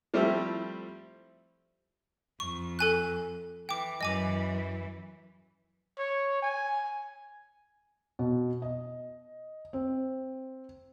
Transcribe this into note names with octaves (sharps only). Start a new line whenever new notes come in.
F3 G3 A3 C4 E4 G4
F2 C#6
A4 G#5 F#6
E3 G5 D6
F#2 E3 D#5 G#5 D6
C#5
G#5
B2
D#5
C4